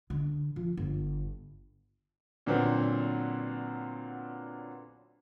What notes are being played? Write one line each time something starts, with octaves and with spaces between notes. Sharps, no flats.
D3
F3
G1
A#2 D3 F#3 B3 C4